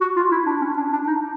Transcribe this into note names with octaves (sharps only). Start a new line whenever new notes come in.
F#4
F4
E4
D4
C#4
D4
D4
D#4